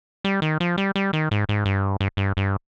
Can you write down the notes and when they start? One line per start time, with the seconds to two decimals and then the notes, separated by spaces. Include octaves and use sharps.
0.24 G3
0.42 D#3
0.60 F3
0.78 G3
0.96 G3
1.13 D#3
1.31 G#2
1.49 G#2
1.65 G2
2.01 G2
2.17 G2
2.37 G2